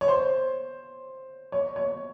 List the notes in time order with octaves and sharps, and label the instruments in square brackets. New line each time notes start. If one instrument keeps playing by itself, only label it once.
[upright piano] C#5
C5
C#5
C#5